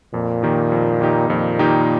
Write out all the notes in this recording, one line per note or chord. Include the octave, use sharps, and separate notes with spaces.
F2 A#2
D#3 A#3 D#4 G4
F2
D#3 A#3 D#4 G4
F2 A#2
D#3 A#3 D#4 G4